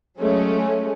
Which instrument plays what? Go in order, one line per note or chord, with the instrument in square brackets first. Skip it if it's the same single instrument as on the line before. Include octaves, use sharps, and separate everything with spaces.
[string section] F#3 G#3 A3 C#4